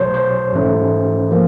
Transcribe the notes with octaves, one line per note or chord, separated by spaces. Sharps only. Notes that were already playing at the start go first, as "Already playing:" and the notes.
Already playing: B1 B2 F#3 A3 C5 C#5
C5
G#2 E3 A3 C#4
F3 A#3